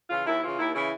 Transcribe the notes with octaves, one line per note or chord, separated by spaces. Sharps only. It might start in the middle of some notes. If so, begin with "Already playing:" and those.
C#3 E3 F4
D#2 E4
C#3 E3 F4
D#2 E4
C#3 E3 E4